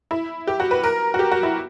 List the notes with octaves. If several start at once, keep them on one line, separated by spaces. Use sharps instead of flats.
E4
G4
F#4
B4
A#4
F#4
G4
F#4
E4